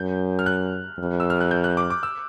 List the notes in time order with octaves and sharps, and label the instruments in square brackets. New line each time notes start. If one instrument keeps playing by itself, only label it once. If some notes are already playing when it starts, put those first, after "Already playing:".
Already playing: [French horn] F#2 [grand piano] G6
[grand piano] F6
F#6
[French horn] F2
[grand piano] E6
F6
F#6
G6
F#6
D6
D6
E6